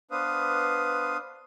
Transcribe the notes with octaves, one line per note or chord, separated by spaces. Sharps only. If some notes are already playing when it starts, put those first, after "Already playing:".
B3 D4 B4 C5 F5 D#6